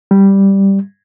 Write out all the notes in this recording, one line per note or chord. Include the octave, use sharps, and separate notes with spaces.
G3